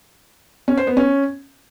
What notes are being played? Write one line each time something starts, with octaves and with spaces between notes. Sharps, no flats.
C#4
C5
B3
C#4